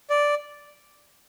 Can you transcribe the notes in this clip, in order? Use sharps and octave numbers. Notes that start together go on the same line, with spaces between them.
D5